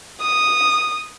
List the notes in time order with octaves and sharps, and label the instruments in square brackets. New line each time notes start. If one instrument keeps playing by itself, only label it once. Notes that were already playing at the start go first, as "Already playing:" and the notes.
[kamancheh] D#6